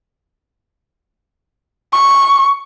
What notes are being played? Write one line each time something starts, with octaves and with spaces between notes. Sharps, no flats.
C#6